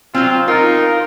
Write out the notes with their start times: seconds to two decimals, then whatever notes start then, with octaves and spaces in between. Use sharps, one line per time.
0.14 F#3 C4 F4
0.48 D#4 F4 A#4